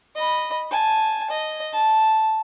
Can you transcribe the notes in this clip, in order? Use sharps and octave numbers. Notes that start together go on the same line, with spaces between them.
D#5 B5
G#5 A5
D#5
A5